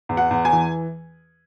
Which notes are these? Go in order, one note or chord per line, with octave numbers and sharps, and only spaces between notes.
E2
F#5
E2
G#5
E3